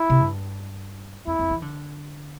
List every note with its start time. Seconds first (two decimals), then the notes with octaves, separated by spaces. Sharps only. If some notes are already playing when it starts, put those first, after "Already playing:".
Already playing: E4
0.10 C3
0.21 G2
1.27 F2 E4
1.39 F2
1.50 E3
1.62 D3